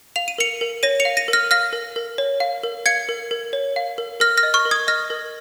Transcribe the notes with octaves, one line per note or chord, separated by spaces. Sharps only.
F5 F7
D#7
A#4 C#7 F7
A#4
C#5 A#6 D#7
C#7 F7
F5
A#6 D#7
A#4
F6 A#6
F5 F6 A#6
A#4
A#4
C#5
F5
A#4
F5 G#6 C#7
A#4
A#4
C#5
F5
A#4
A#4 F6 A#6
F6 A#6
D#5
C#6 F6
A#4
D#6 G#6
D#5 F6 A#6
A#4